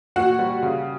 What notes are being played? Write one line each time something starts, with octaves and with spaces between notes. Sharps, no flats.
A#2 F#4 F#5
G3
C#3